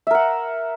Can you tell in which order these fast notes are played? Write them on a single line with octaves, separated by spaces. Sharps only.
E5 A#4 F#5